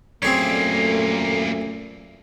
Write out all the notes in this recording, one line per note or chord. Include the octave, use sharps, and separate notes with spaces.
F#2 A#2 G3 A3 A#3 C4 G#4 C#5